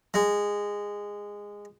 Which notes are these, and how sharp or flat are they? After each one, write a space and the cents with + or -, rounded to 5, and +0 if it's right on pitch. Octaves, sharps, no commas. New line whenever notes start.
G#3 -15